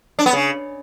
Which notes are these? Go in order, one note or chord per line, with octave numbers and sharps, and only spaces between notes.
D4
B3
C#3